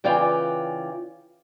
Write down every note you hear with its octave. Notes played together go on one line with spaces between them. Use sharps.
C#3 E3 F4 D5 G5 G#5